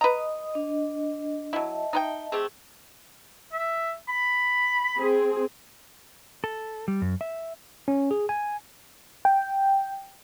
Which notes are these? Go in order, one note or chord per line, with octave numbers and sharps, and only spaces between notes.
B4 D#5 A#5 D#6
D4 D#5
F#3 E4 D#5 E5 A5
D#4 B4 G5
A3 C4 G4 G#4
E5
B5
C4 G#4
A4
G3
F#2
E5
C#4
G#4
G#5
G5